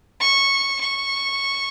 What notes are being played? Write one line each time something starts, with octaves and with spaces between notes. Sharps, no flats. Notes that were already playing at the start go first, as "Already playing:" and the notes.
C#6
C#6